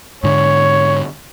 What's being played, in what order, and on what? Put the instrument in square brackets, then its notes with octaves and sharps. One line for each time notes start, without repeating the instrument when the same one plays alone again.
[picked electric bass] G#2 D3 [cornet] C#5